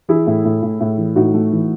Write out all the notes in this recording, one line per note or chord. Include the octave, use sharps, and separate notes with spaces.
E3 E4 G#4
A2
A2
A2
A2
E3
A2 D#4 F#4
A3
E3